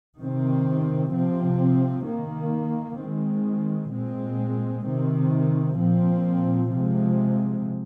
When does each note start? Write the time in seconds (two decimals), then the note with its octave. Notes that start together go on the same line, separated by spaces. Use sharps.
0.21 C3 D#3 C4
1.13 C3 F3 C4
2.06 D#3 A#3
2.99 D#3 G#3 C4
3.93 A#2 G#3 C4
4.86 C3 D#3 C4
5.79 A#2 F3 C4
6.72 C3 F3 G#3 C4